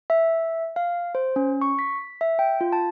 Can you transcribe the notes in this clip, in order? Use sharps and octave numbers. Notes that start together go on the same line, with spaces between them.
E5
F5
C5
C#4
C#6
B6
E5
G5
F4
A5